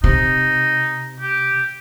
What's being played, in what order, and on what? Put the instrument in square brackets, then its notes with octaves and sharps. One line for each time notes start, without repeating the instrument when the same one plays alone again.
[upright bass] C3 [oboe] D#4
[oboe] G4